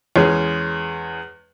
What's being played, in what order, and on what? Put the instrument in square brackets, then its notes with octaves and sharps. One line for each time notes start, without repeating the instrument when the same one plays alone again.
[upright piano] E2 G#3 C#4 G#4